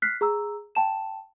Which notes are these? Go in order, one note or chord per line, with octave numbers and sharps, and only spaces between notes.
F6 F#6 B6 C7
G#4 A#5 E6
G5 A5 E7